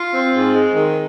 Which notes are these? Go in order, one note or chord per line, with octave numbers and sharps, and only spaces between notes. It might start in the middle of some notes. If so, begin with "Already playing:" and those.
Already playing: F4
C4
G#2
G#3
D#3